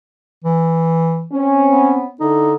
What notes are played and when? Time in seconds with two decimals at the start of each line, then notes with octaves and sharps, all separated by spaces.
0.44 E3
1.33 C4 C#4
1.67 B3
2.21 D3 D#4 E4 A4